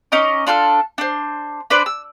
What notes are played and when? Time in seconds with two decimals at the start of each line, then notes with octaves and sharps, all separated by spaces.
0.12 C#4 D#4 D#5 D6
0.47 D4 F4 A4 F6
0.98 D4 C5
1.70 D4 B4 C5 D5
1.86 E6